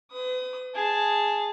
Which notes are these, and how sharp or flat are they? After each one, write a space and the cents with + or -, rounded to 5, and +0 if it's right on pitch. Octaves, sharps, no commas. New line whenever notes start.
B4 +45 D#6 +15
G#4 +0 A5 +0